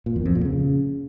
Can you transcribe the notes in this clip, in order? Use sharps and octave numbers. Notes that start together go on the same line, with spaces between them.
A#2
E2
F2
A#2
C#3